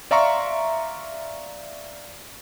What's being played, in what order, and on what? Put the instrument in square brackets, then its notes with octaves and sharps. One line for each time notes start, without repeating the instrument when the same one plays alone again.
[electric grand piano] D5 E5 F5 A#5 C6 C#6